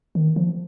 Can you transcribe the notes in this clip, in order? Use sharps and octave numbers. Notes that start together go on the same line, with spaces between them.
D#3
F3